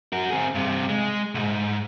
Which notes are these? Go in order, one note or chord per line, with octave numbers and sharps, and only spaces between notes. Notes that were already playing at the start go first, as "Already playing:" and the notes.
F#4 A#4
C4 G#4
G2 C3
G#3
C2 G#2